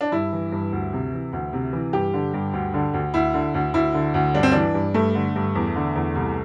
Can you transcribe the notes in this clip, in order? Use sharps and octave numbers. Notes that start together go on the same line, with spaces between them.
D4
G2 E4
E3
G2
D2
C3
E3
D2
C3
E3
G2 G4
D3
G2
D2
D3
D2
D2 E4
D3
D2
D2 E4
D3
D2
G2 D4
C4
E3 D4
G2
G2 A3
D3
G2
E2
D3
E2
C2